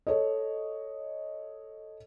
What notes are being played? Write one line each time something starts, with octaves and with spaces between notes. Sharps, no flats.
A4 C#5 D#5